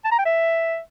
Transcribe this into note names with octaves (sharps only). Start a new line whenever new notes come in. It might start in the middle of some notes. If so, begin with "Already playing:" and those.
A5
A#5
G5
E5